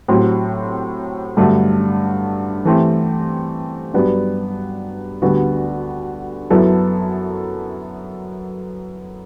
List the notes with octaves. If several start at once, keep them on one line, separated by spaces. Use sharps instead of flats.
A2 F#3 C4 G4
G2 D3 F#3 A3
E3 A3 C4 G4
G2 F#3 B3 D4 G4
D2 D3 G3 B3 F#4
F#2 F#3 B3 E4 A4